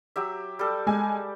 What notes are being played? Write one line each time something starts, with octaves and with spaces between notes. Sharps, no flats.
F#3 G4 E5
G3 A4
G#3 G#5